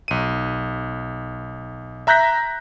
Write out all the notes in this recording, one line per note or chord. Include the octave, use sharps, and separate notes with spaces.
B1 D#7
E5 A#5 F#6 G6 A#6 B6